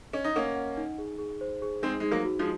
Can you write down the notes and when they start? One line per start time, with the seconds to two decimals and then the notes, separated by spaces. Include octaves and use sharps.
0.13 C#4 D#5
0.24 D#4
0.35 A#3 C#4 F#5
0.55 F#5
0.77 D#4
0.98 G#4
1.19 G#4
1.41 C5
1.62 G#4
1.82 G#3 C4 D#4
2.00 G#3 D#4
2.11 F#3 A#3
2.25 F#4
2.39 F3 G#3